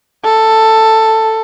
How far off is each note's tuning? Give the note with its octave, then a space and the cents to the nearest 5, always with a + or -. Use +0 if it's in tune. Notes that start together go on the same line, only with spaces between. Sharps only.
A4 +10